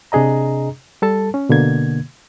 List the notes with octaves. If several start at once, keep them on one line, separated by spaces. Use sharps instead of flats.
C3 D4 G#4 D#5 A#5
G3 A4 A5
C#4
B2 D3 A#3 G#6